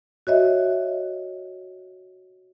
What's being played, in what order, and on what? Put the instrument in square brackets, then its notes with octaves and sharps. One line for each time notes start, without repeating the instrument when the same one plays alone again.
[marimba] F#4 C#5 D#5 E5